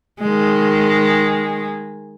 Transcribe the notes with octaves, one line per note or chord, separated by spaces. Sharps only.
D#3 G#3